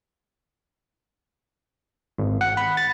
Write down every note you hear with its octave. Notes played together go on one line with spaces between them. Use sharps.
G#1
F#5
B5
A6